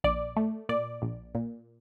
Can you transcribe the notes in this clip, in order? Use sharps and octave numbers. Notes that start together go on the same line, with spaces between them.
A#1 D5
A3
A#2 D5
A#1
A#2